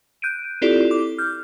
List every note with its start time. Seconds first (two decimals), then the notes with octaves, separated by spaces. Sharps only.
0.22 F#6 G6 D7 D#7
0.62 C4 E4 F4 G4 A4 D5
0.91 D6
1.18 F6 G6